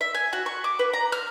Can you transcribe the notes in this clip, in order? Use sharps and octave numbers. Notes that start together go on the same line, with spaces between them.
E5
G#5
F#4
C#6
D6
B4
A#5
F6